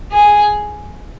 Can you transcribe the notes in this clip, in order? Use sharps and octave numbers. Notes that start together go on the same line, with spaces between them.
G#4